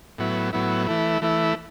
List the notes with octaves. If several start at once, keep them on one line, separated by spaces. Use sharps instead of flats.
A2 F#3 B3 E4
A2 F#3 B3 E4
E3 A3 E4
E3 A3 E4